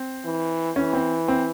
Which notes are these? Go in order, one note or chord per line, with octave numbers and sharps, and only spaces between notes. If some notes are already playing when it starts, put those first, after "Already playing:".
Already playing: C4
E3
E3 C#4
C4
C4